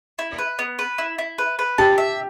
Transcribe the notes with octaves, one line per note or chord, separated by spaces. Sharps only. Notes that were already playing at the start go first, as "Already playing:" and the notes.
E4
B4
B3
B4
E4
E4
B4
B4
G4 A5
E5